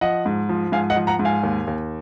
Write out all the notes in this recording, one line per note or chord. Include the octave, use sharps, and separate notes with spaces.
F3 D#5 F#5
G#2
F3
G#2 F5 G#5
D#5 F#5
F3
F#5 A#5
G#2
F5 G#5
D#2
D#2